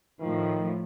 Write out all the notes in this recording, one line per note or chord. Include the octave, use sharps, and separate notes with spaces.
A2 D#3 F3